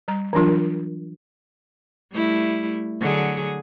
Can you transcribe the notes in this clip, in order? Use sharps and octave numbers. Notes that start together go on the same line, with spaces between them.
G3 A#5
E3 F#3 D4 F4 A#4
G3 A3 E4
D3 F#3 G#4